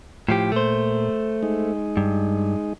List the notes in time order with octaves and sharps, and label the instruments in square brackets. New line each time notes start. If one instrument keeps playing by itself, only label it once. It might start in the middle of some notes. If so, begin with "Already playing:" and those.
[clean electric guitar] A2 F3 G4
[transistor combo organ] A#2 [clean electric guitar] A3 C5
[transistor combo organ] G#3 D#4
[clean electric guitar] G2